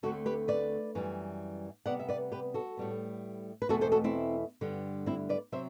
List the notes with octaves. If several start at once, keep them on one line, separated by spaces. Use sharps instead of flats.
D2 D3 A3 C4 F#4 A4
G4 B4
B4 D5
F#2 E3 G3
C3 G3 B3 D5 F#5
E5
B4 D5
G4 B4
F#4 A4
A2 G3 B3
B4
E2 B2 A3 C4 F#4 A4
A4 C5
F#4 A4
C4 E4
G2 D3 G3 B3
C4 E4
B4 D5
C3 F#3 C4 C5 E5